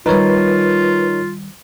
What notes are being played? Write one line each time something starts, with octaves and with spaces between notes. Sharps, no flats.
D#3 G3 D#4 F4 A#4 B4 C#5